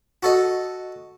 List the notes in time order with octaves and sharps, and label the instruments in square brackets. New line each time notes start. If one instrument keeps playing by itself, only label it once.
[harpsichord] F#4 A4 D#5